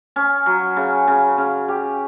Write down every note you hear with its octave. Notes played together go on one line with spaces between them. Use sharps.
C#4
F#3
C#3
C#3
C#3
G4